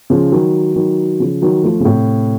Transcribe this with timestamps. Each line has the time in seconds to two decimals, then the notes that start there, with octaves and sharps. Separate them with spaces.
0.10 C#3 F3
0.32 D#3 F#3
0.76 D#3 F#3
1.20 C#3 F3
1.42 D#3 F#3
1.64 F3 A3
1.80 C#3
1.85 A2 C3